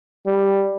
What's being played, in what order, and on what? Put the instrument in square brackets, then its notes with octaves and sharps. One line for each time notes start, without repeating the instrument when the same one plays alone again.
[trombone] G3